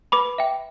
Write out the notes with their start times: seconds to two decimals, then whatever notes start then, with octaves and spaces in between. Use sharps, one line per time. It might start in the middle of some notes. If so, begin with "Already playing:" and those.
0.12 B4 B5 D6
0.38 E5 G5